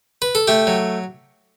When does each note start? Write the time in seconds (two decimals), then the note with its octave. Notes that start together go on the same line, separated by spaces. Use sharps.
0.22 B4
0.35 A4
0.48 A3 G4
0.67 F#3